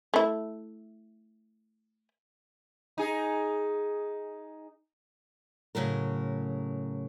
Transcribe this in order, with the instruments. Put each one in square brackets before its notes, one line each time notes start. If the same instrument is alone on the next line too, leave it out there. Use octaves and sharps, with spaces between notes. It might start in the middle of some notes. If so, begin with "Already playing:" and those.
[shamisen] A3 E4
[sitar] D#4 G#4
[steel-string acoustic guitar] A2 C#3 F#3 A#4